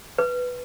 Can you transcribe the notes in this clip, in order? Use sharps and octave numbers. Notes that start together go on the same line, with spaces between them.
B4